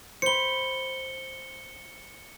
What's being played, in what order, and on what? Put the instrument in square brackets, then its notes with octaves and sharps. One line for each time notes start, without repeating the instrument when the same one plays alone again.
[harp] C5 B5 [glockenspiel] C#7 G7